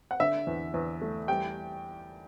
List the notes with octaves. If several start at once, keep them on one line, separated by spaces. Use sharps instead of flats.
F#5
D3 E5
E2
E2
A3
G3 G5